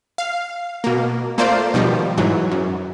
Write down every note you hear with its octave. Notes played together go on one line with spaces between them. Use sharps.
F5
B2 A#3
A3 A#3 F4 C5 D5
B2 D#3 F3 G3
G#2 E3 F#3
F#2